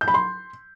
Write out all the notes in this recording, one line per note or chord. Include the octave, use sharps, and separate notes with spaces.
G6
B5
C6